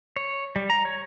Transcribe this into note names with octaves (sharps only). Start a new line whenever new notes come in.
C#5
G3
A#5
C#5